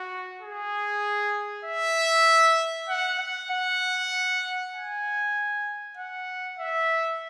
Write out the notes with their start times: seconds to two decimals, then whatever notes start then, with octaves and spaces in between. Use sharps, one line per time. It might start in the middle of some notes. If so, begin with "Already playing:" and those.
Already playing: F#4
0.41 G#4
1.65 E5
2.89 F#5
3.20 F#5
3.50 F#5
4.74 G#5
5.97 F#5
6.59 E5